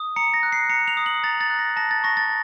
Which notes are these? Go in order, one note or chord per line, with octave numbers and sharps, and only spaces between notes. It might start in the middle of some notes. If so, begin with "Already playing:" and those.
Already playing: D#6
A#5 C#7
A#6
F#6
C7
A#5 C#7
F7
D#6
F#7
A#5 A6
A6
F#6
A#6
A5 A#6
A6
C#6 A#6
A6